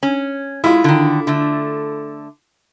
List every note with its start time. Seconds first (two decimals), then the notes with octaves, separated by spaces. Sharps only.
0.03 C#4
0.64 G#3 E4 F4
0.84 D3 D#3
1.27 D3 A3